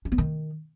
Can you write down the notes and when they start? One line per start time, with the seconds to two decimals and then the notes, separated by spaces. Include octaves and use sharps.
0.05 D4
0.12 B3
0.18 D#3